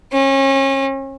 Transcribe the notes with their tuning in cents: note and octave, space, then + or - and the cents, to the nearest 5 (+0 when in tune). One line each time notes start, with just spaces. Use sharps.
C#4 -35